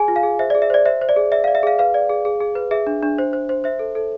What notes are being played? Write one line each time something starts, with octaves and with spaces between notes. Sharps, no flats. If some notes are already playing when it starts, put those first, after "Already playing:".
Already playing: G#4 G#5
F4
F5
G#4
C5 E5
G#4 D5
E5
C5 D5
C5 E5
C5
D5
G#4
D5 E5
D5 F5
E5
G#4 F5
B4 F5
D5
G#4
G#4
G#4
B4
G#4 E5
D4
D4
C5
C5
C5
C5 E5
A4
A4